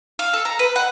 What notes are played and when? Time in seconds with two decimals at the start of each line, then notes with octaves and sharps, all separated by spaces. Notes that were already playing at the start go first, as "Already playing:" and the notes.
0.19 F5
0.33 A4
0.45 A#5
0.59 B4
0.76 F#5